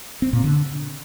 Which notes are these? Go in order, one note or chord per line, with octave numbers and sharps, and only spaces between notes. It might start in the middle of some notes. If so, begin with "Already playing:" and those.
C4
A#2
D3